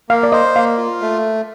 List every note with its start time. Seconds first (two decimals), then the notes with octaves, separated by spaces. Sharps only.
0.09 A#3 F5
0.23 D5
0.32 C5 D#5
0.56 A#3 F5
0.78 F4
1.01 A3